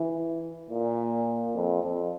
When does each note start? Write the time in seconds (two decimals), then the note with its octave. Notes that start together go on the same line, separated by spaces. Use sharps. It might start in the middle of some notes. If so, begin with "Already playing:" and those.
Already playing: E3
0.70 A#2
1.55 F2
1.83 F2